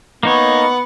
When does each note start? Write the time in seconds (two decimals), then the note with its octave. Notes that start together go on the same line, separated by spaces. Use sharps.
0.23 A#3 B3 D#4 C#5